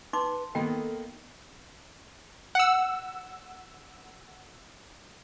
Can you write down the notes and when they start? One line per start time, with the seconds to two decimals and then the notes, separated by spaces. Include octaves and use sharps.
0.13 D#4 B4 C6 D6
0.55 D#3 A#3 B3 A4 G5
2.55 F#5 E6